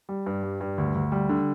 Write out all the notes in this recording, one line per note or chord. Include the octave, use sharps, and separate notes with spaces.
G3
G2
G3
G2
D2
D2
G3
D3